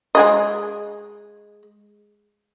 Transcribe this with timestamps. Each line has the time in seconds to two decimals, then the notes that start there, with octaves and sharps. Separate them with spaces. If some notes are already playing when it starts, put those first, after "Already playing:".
0.15 G#3 G#4 D#5